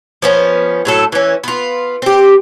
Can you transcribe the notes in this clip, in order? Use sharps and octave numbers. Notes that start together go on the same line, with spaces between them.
F3 B3 C#4
A2 F#3 A4
E3 C#4
B3 F4
C4 G4